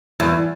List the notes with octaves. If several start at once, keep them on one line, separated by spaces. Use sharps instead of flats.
E2